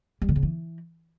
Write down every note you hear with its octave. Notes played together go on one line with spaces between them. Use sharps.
G3
D3
C#3
E3